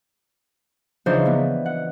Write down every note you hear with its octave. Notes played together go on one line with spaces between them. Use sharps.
C#3 E3 F3 D4 D#4 C5
E3 B3
F#5